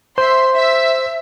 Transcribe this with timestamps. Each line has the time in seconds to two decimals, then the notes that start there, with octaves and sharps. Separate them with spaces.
0.18 C5 E5 C6
0.54 E5